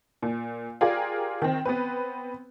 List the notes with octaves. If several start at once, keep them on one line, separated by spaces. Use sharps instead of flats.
A#2
F4 G4 G#4 A#4 D5 F5
D#3 C4
B3 C4 B4